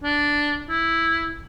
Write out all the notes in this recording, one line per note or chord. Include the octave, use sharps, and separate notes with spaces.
D4
E4